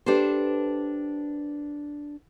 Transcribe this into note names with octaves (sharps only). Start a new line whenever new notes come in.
D4 G4 A4 B4 C5